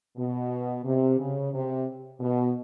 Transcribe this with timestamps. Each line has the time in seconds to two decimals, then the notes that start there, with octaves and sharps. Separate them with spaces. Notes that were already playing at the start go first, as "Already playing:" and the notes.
0.17 B2
0.85 C3
1.18 C#3
1.53 C3
2.20 B2